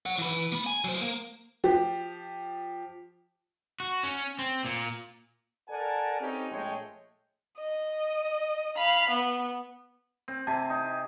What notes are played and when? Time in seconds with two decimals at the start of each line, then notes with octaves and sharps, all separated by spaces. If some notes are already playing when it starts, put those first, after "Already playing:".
0.06 C#5 F#5
0.18 E3 B4
0.52 A#3 B5
0.66 G#5
0.84 F#3 C5
1.01 A#3
1.64 F3 G4
3.80 F#4
4.03 C#4
4.39 C4
4.65 A#2
5.69 A4 A#4 D5 F#5 G#5 A5
6.21 C4 C#4 D#4 G4 A4
6.51 A#1 G#3 A3 C#5 D#5 G5
7.59 D#5
8.77 F5 B5
9.10 B3
10.28 C4
10.47 C3 G#5 A5
10.70 D#4